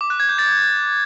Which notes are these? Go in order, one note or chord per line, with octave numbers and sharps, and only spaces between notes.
D6
F#6
G#6
G6
A6